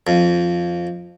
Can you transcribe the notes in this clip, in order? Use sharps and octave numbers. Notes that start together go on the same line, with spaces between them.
F2